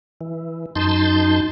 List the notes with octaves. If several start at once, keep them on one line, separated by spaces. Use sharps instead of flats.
E3
F#2 D#4 A5 C6 G6